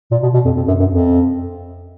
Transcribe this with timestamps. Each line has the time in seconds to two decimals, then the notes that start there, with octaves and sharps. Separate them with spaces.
0.11 A#2
0.23 B2
0.34 B2
0.45 F2
0.57 F2
0.68 F#2
0.79 F#2
0.90 F2